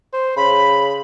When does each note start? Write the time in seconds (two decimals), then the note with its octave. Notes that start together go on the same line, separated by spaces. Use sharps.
0.13 C5
0.36 C#3 B5